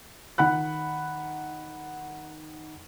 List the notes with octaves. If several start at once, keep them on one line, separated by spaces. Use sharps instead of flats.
D#3 F#5 B5 F#6